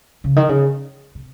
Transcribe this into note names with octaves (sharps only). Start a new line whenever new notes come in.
C#3
D#3
C#3
C3